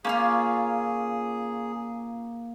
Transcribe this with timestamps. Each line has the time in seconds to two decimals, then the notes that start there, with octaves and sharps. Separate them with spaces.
0.05 A#3 C#4 E4 F4 G#4